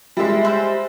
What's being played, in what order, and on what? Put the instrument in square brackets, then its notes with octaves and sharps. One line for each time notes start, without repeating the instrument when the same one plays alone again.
[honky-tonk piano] G3 G#3 [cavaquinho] E4 E5
[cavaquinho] B4 C5 E5